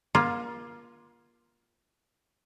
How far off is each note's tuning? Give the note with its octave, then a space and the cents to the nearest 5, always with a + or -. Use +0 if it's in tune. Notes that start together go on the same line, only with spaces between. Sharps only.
A#3 +30 F4 +0